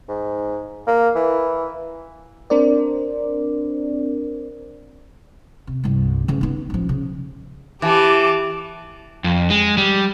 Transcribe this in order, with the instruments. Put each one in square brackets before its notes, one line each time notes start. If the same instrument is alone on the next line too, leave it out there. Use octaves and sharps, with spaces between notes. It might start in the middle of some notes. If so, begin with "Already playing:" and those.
[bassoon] G#2
A#3
E3
[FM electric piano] C4 D4 A#4 C5 D5
[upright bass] C3
C2 G2
C#3 E3
B3 D#4
A1 F3
C#3
[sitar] E3 [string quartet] G4 A5 D6
[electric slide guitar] F2
G#3
G3